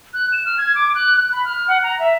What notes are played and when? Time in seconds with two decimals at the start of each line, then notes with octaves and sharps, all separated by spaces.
0.14 F#6
0.33 E7
0.46 F6
0.58 G#6
0.75 D6
0.95 F#6
1.16 F#6
1.32 B5
1.45 F6
1.68 F#5
1.83 A#5
1.99 E5